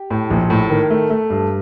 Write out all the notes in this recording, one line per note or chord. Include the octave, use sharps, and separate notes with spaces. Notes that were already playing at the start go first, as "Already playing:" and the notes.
Already playing: G4
A2
A#1
A2
D#3
A3
A3
G2